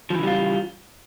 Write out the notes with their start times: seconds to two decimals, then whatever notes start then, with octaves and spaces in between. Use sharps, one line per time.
0.10 F3
0.15 E3
0.19 C#3
0.23 G3
0.27 F4